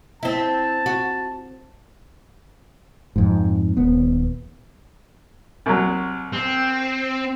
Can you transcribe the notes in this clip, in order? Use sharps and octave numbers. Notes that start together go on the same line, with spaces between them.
C4 E4 A5
F#4
F2 G#2
D#1 B3
C2 F#3
C4